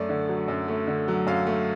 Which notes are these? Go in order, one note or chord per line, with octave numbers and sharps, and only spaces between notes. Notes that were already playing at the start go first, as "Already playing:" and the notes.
Already playing: F#2 A3 D5
D3
F#3
F#2
A3
D3
F#3
F#2 F5
A3